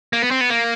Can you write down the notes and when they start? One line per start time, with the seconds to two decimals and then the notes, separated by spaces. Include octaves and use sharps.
0.13 A#3
0.22 B3
0.31 C4
0.41 B3
0.50 A#3